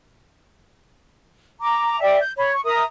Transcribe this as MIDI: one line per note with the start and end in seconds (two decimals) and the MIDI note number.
1.60 1.99 82
1.60 1.99 86
2.00 2.18 74
2.00 2.18 76
2.00 2.18 79
2.20 2.31 91
2.37 2.52 73
2.37 2.52 83
2.52 2.63 85
2.64 2.82 70
2.64 2.82 76
2.64 2.82 82
2.64 2.82 87